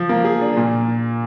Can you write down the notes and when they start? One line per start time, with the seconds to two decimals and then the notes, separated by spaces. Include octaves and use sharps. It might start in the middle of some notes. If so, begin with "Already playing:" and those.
Already playing: F3
0.09 A#3
0.24 G#4
0.41 D4
0.57 A#2